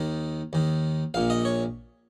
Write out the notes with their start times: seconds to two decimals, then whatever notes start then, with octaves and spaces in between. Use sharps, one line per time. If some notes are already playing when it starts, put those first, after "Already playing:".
Already playing: D#2 D#3
0.53 D#2 D#3
1.14 A#1 A#2 F5
1.30 D#5
1.45 C#5